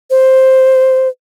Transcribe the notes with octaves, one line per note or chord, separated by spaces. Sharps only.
C5